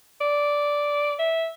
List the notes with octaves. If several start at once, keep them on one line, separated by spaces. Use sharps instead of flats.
D5
E5